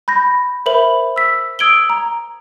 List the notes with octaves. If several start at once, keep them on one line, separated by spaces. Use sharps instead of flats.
B5 G6 A#6
A#4 C5 E5 B5 F#7
E6 B6
D#6 E6 G#6 D7 F#7 G7
A#5